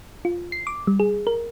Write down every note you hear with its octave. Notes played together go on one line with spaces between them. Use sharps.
F4
C7
D6
G3
G#4
A#4